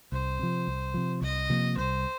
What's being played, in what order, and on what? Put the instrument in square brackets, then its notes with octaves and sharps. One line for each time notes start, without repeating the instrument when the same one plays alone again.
[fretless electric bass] C2 [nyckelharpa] C5
[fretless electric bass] C3 F3
C2
C3 F3
[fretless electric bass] C2 [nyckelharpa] D#5
[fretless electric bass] C3 F3 A#3
[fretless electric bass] C2 [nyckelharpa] C5